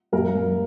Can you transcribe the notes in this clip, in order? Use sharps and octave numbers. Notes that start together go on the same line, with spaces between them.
F#2 A#3 A#4
F#2